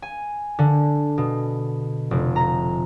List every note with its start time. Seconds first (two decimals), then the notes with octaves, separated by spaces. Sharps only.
0.02 G#5
0.59 D3
1.18 B2
2.11 F1
2.36 A#5